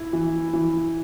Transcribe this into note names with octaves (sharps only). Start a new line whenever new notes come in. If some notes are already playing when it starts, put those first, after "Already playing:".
Already playing: E4
E3
E3